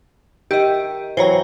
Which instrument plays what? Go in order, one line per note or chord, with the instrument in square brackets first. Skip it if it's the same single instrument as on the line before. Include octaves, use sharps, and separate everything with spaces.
[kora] D#3 E5 [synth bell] G4 D#5
[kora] E3 F#3 C4 [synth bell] C5 C#5 A#5